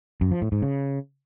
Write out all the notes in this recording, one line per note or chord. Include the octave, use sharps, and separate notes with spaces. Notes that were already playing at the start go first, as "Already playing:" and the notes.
F#2
F3
A2
G#2
C#3